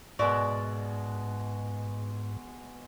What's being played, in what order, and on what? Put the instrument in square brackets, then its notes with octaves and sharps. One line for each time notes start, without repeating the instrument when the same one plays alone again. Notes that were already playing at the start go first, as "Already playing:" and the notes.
[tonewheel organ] G#2 [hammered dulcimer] B2 G#3 F#4 [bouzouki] A#4 D5 E5